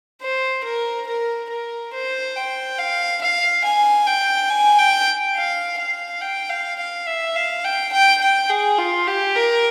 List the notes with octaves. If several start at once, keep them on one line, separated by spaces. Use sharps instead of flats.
C5
A#4
A#4
A#4
C5
G5
F5
F5
G#5
G5
G#5
G5
F5
F5
G5
F5
F5
E5
F5
G5
G5
G5
G#4
F4
G4
A#4